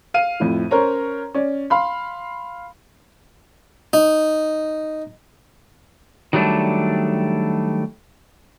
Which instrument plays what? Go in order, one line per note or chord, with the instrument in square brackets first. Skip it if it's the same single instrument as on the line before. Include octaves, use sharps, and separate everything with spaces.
[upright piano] F5 D#7
F2 A2 F3
C#4 A#4 C5 C#5 A#5
C#4 D5
F5 B5 C6
[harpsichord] D#4
[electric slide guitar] D#3 F#3 G3 A3 D4